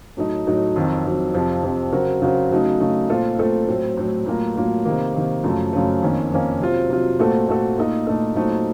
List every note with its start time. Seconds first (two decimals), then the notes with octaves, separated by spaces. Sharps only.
0.17 A2 F#3 A3 D#4
0.47 A2 F#3 A3 D#4
0.76 F2 D#3 F#3
1.05 F2 D#3 F#3
1.34 F2 C3 F3
1.63 F2 C3 F3
1.92 C#3 F#3 C4 F#4 A#4
2.22 C#3 F#3 C4 F#4 A#4
2.51 C#3 F#3 A3 D#4
2.80 C#3 F#3 A3 D#4
3.09 A#2 A3 C4 F4 A4
3.39 A#2 A3 C4 F4 A4
3.68 A2 F#3 C4
3.97 A2 F#3 C4
4.26 A2 F#3 A#3 F4 A#4
4.56 A2 F#3 A#3 F4 A#4
4.85 C3 D#3 A#3
5.14 C3 D#3 A#3
5.43 F#2 C#3 F3 A3
5.73 F#2 C#3 F3 A3
6.02 F2 D#3 A#3 C#4
6.31 F2 D#3 A#3 C#4
6.61 C3 F#3 C4 F4
6.90 C3 F#3 C4 F4
7.19 A#2 A3 C4 F#4 A4
7.48 A#2 A3 C4 F#4 A4
7.77 A#2 A3 D#4 A4
8.07 A#2 A3 D#4 A4
8.35 A#2 F#3 A3 C4 D#4